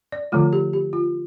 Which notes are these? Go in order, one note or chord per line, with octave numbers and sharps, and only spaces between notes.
D5
D3 F3 A3 F4
G4
G4
F4